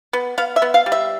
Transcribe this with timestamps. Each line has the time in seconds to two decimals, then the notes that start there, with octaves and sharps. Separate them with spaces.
0.13 B3
0.38 B3 F5
0.56 E5
0.62 B3
0.74 F5
0.86 G3
0.92 E5